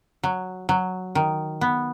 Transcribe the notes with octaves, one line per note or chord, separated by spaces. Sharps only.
F#3
F#3
D#3
B3